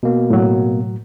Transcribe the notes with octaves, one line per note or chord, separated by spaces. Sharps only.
B2 A#3
A2 F#3